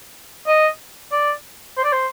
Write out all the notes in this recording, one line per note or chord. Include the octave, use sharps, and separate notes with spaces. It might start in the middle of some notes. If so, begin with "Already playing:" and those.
D#5
D5
C5
D5
C5